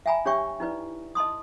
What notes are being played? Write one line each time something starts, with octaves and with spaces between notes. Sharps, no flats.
E5 G5 G#5 A#5 B5
D4 G4 C#5 E5 G5 C#6
D#4 E4 B4 D5
D#5 A5 C6 D#6